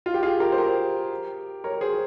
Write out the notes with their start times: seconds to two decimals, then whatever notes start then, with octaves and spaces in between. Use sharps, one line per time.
0.06 F4
0.14 G4
0.23 F4 G#4
0.40 G4 A#4
0.52 C5
0.58 G4 A#4
1.64 A#4 C#5
1.81 G#4 C5